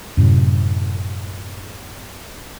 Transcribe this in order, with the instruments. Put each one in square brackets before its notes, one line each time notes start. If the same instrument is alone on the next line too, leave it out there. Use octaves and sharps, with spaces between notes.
[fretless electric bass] F#2 A2 C3 F#3